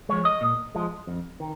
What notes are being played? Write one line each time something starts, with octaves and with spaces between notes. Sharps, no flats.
F3 G#3 C#5
D#5
A#2
F3 G#3
F2
D#3